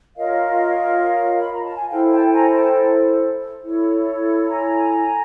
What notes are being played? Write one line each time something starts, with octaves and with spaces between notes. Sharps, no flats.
F4 A#4 C#5 D#5 F5
B5
A#5
A5
G#5
E4 A4 C5 F5 G5
G5 A5
G#5 A#5
G5 A5
E4 A4 C#5
G#5 A#5